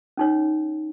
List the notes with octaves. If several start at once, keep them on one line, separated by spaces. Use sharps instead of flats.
C#4 D#4 C#5